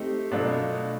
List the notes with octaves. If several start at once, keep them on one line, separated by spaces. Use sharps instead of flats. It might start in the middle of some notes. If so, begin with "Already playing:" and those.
Already playing: A3 C4 D#4 G4
B2 F#3 A3 D4 F4